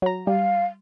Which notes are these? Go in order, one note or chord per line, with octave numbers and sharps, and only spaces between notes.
F#3 A#5
G3 F5